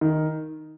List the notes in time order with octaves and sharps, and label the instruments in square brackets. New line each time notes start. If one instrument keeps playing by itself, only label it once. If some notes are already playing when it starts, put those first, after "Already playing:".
[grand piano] D#3